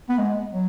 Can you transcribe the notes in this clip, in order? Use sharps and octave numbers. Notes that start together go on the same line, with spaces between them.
B3
G#3
F#3